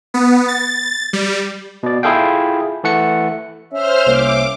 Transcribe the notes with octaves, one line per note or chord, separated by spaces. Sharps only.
B3
A6
G3
B2 D5
E4 F4 G#4 A4 F5 G5
E3 A3 F#5 C#7
C#4 C5 E5 F6
C2 A#3 D6